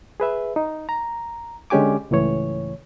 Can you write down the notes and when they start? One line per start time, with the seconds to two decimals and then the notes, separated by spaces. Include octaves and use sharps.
0.20 G#4 B4 E5
0.56 D#4
0.89 A#5
1.70 D3 G#3 C#4 G4 G#5 D6
2.11 C#2 A2 E3 C#5